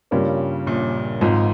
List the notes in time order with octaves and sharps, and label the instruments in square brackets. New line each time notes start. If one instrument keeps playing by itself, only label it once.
[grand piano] G2 [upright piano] C#3 G3 A#3 C#4 F4
[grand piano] A#1 A#2
[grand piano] G#1 G#2 [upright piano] F3 C4 F4